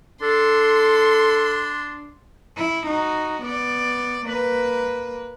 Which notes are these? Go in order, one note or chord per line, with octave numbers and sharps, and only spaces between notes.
D4 A4 C6
E4
D#4 F#4
B3 D5
A#3 B4